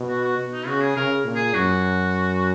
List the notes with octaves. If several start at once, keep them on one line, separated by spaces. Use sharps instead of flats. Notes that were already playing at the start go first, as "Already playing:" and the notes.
Already playing: B2
F#4
F#4
B2
D#4
C#3 F#4
G#4
C#3 A#4
A#2
G#4
F#2 F#4